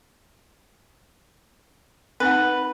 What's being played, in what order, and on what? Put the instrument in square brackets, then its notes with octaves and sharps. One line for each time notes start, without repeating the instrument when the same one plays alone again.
[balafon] C4 D#4 F#5 [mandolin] B4